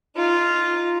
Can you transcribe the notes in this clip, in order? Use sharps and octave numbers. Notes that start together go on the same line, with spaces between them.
D#4 F4